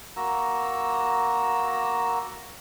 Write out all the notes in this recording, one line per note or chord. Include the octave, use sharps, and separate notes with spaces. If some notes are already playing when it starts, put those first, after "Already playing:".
A#3 F#4 A#5 E6